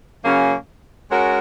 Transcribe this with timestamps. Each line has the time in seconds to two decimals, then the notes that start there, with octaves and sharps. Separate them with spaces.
0.25 C#3 F#3 A#3 C#4
1.11 G#3 C#4 F#4 A#4